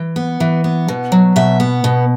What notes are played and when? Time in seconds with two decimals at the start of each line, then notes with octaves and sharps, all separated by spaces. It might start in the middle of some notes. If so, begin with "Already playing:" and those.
Already playing: E3
0.16 B3
0.40 E3
0.64 B3
0.88 B2
1.12 F#3
1.36 B2 E5
1.60 B3
1.84 B2